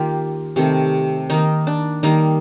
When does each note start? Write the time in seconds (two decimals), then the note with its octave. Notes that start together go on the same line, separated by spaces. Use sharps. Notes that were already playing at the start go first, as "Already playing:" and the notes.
Already playing: D#3 A#3 F4 G4
0.56 C3 D#3 A3
1.30 D#3 A#3 D#4
1.67 D4
2.03 D#3 G3 A#3 D#4